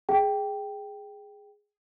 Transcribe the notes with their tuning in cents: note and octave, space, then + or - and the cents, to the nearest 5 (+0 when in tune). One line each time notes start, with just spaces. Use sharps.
G#4 +0 G5 +0